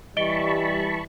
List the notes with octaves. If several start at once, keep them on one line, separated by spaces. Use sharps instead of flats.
E3 G3 D#5 A5 B5 C#6 D7 G7